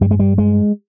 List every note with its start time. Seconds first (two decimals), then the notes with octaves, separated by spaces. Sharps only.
0.01 G2 G3
0.11 G#3
0.20 G3
0.38 G#3